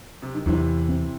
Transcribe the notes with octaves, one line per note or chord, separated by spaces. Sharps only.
C3
D#3
E2 C3 E3
C4